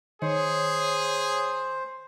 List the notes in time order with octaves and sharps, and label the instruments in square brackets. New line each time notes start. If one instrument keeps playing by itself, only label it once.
[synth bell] D#3 [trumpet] G#4 [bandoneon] C5 [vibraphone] C#5